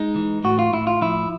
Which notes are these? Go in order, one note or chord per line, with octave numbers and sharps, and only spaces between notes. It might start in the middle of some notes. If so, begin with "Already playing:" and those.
Already playing: G#3 D#4
E3
A2 F#4
F4
A2 E4
F4
F3 E4